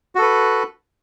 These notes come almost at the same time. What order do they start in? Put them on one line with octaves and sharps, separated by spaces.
F#4 A4 B4